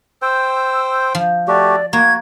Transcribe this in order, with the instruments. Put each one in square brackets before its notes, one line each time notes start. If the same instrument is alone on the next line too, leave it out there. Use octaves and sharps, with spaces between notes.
[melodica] C5 G5 [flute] E6
[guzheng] F3
[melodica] A3 F#4 G4 [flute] D5
[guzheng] A#3 [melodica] F#4 [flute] G#6